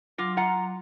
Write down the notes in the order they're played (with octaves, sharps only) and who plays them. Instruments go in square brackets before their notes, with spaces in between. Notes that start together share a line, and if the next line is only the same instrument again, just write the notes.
[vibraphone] F#3 [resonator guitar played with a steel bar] F4 [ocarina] D6
[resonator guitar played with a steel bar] F4 F#5 [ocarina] A#5